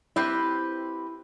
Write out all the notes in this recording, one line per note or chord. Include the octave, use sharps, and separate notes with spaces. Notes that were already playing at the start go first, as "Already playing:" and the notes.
C4 E4 G4 B4